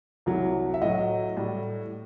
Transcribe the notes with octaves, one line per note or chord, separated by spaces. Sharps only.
C2 C3 F#3
E5
A2 F#3 D#5
A2 G3